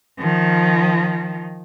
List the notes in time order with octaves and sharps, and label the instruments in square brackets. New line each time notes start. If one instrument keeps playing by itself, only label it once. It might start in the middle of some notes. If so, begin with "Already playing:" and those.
[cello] D#3 F3